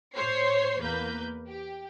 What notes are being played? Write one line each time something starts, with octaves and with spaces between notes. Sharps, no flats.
A2 C5 C#5 C7
E2 A#3 B4 G6
G4